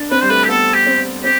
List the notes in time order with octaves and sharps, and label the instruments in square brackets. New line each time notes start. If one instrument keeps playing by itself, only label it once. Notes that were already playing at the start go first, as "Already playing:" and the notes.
Already playing: [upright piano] D4
[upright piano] C4 [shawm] B4
[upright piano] G3 [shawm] C5
[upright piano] A3 [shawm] B4
[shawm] G4
[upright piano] B3 [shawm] A4
[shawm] G4
[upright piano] C4
[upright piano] C4 [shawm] G4